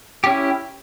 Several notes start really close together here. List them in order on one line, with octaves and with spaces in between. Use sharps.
G4 C#4 E4